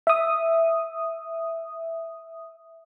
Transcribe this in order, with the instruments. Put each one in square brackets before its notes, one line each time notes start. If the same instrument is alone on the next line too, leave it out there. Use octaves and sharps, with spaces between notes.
[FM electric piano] E5 D#6